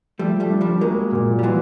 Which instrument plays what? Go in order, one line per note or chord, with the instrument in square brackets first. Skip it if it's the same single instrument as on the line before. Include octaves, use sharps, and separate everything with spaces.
[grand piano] F3 [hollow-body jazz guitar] G3 A3
[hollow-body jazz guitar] G3 A3
[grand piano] D4
[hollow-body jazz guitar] F3 G3
[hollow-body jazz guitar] F#3 G#3 [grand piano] A#3
[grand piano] A#2
[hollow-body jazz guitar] G3
[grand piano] E3 [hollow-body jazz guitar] F#3 G#3